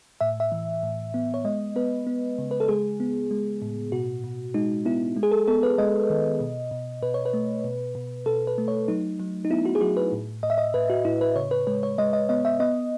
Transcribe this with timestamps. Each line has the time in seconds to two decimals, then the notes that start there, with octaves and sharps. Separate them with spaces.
0.21 A2 E5
0.40 E5
0.52 E3
0.83 A2
1.14 B3
1.34 C#5
1.45 G#3 D#5
1.76 B3 B4
2.07 B3
2.38 C#3
2.51 B4
2.60 A4
2.68 G#3 G#4
3.00 B3
3.31 G#3
3.62 A2
3.92 B2 F#4
4.24 B2
4.54 G#3 D#4
4.85 B3 E4
5.16 G#3
5.23 G#4
5.32 A4
5.48 B3 A4
5.63 B4
5.78 G#3 D#5
6.10 D#3
6.40 B2
6.71 B2
7.03 B2 B4
7.14 C#5
7.26 B4
7.33 A3
7.64 B2
7.95 B2
8.26 B2 A4
8.47 B4
8.58 A3
8.68 C#5
8.88 F#3 D#4
9.20 F#3
9.45 D#4
9.50 B3 E4
9.65 F#4
9.75 G#4
9.81 F#3 F#4
9.97 B4
10.12 A2
10.43 A2 D#5
10.50 E5
10.58 D#5
10.74 A2 B4
10.90 F#4
11.05 A2 E4
11.21 B4
11.36 C#3 C#5
11.51 B4
11.67 G#3 B4
11.83 C#5
11.98 G#3 D#5
12.13 D#5
12.29 B3 D#5
12.45 E5
12.60 B3 D#5